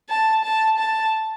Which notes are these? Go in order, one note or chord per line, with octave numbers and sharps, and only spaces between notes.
A5
A5
A5